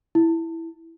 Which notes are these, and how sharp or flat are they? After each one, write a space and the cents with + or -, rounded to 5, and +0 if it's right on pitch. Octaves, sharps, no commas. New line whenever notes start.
E4 +0